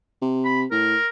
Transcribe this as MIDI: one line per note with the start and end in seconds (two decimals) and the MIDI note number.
0.22 0.65 48
0.45 0.61 83
0.71 0.95 45
0.71 1.07 70